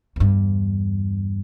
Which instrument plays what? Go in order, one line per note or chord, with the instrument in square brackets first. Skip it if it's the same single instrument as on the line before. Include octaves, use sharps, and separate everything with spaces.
[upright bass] E2 G2